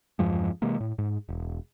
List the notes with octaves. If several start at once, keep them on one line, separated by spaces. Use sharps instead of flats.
E2 G2 F3 G#3
C3 E3 G#3 A#3
A2
G#2
E1